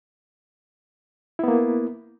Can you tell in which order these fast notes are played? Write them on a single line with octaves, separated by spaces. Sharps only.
E4 B3 A#3